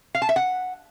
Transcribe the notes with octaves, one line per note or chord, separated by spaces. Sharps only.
F5
A5
E5
F#5